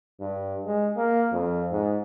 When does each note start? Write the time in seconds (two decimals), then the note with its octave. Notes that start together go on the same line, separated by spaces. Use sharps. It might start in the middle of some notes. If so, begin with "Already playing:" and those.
0.20 G2
0.66 G#3
0.97 A#3
1.33 F2
1.71 G#2